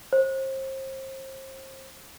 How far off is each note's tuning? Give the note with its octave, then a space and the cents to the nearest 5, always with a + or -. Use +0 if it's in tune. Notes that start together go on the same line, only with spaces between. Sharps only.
C5 +35